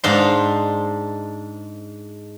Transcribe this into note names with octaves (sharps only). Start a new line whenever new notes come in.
G#2 D4 C5 F5 C6